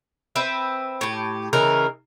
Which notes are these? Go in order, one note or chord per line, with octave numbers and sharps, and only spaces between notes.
C4 B4 E5
A2 G4
C#3 E3 D#4 A#4